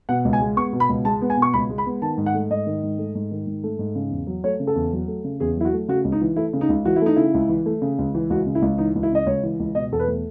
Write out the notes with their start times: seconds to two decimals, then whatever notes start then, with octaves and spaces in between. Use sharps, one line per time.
0.09 B2 F#5
0.25 C#2
0.33 G#5
0.41 G#3
0.56 B3 C#6
0.73 B2
0.80 B5
0.89 C#2
1.05 G#3 A5
1.22 B3
1.30 G#5
1.37 B2
1.42 C#6
1.54 C#2 B5
1.70 G#3
1.78 B5
1.86 B3
2.02 D#3 A5
2.17 G#2
2.26 F#5
2.34 A3
2.50 G#2 D#5
2.66 D#3
2.83 G#2
2.98 A3
3.15 G#2
3.31 D#3
3.47 G#2
3.64 A3
3.79 G#2
3.95 C#3
4.11 E2
4.27 F#3
4.44 A3 C#5
4.60 C#3
4.67 A4
4.76 E2
4.93 F#3
5.08 A3
5.24 C#3
5.40 E2 G#4
5.57 F#3 E4
5.65 F#4
5.73 A3
5.88 C#3 F#4
6.05 C#2
6.12 D#4
6.22 E3
6.36 A3 E4
6.53 C#3
6.61 D#4
6.69 C#2
6.85 E3 F#4
6.96 E4
7.02 A3 D#4
7.16 C#3 E4
7.34 C#2
7.49 E3
7.66 A3
7.82 C#3
7.99 C#2
8.15 E3
8.30 C#2 F#4
8.46 C#3
8.55 E4
8.62 C#2
8.78 E3 D#4
8.96 C#2
9.03 E4
9.12 C#3 D#5
9.27 C#2 C#5
9.43 E3
9.60 C#2
9.75 B2 D#5
9.92 E2 A4
10.00 B4
10.08 A3